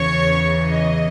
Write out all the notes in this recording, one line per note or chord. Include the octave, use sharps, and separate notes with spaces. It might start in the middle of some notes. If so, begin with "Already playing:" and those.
Already playing: E2 C#3 E3 C#5
D#5